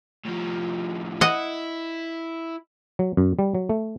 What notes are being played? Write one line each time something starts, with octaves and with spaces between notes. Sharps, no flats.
A2 F3
E4 D#5 F#5
F#3
F#2
G3
F#3
A3